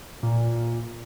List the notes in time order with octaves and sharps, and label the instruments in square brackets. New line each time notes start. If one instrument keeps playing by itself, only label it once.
[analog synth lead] A#2